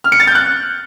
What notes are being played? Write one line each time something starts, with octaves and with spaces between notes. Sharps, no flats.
F6
C#7
A6
G6
F#6